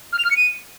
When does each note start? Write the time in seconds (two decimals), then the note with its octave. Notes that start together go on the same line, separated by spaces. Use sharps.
0.12 F6
0.18 F7
0.24 F6
0.30 C#7
0.36 D#7